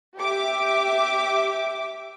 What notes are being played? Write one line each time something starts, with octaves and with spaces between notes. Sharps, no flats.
G4 E5 D6